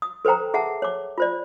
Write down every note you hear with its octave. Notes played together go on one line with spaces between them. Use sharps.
D#6
A4 B4 C5 G5 A#5
G#4 E5 F#5 A5
C#5 D6
F4 C5 D5